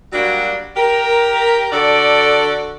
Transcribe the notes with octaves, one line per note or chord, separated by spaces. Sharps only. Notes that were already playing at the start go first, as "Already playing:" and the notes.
F#3 G3 A#3 D4 F#4
G4 A#4
D3 F#4 A4 D5